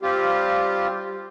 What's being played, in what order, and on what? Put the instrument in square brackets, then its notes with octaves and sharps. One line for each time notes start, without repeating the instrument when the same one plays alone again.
[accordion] G3 C4 F4 G4